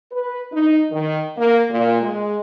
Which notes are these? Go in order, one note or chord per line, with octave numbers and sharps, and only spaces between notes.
B4
D#4
D#3
A#3
A#2
G#3